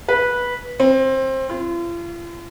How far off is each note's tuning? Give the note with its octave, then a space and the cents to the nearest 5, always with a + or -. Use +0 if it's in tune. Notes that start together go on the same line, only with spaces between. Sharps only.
B4 -15
C4 +20
F4 -40